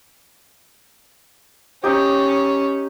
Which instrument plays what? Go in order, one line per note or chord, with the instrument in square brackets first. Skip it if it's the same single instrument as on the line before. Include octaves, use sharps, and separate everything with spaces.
[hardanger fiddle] C#4 [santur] D#4 G4